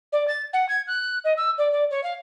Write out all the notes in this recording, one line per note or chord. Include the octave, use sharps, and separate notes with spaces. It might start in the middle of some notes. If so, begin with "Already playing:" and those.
D5
A6
F#5
G#6
F#6
D#5
E6
D5
D5
C#5
F5